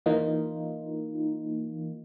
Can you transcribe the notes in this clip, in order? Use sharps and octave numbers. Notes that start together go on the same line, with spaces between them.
E3 A#3 D#4 F4